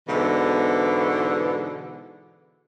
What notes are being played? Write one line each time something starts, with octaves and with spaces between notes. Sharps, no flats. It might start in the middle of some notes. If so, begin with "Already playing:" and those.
G#2 B2 D3 E3